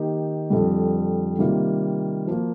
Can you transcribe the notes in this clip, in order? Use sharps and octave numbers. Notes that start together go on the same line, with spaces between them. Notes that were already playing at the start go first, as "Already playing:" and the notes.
Already playing: D#3 A#3 D#4 G4
F2 D3 G3
C3 D#3 G3 A#3 F4
F3 A#3 F4